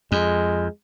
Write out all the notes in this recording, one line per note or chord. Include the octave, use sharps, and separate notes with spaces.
F2 G#3